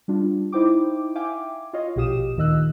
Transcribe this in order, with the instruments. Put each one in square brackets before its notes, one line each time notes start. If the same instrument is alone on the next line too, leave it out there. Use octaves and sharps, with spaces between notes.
[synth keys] G3 D4 F4
D#4 E4 C5 G5 D6
E5 F5 G5 G#5 D6
F4 C#5 D#5 F5
A#1 B2 G4 F5 D#6 E7
D2 A#2 D#3 D#5 E6 F#6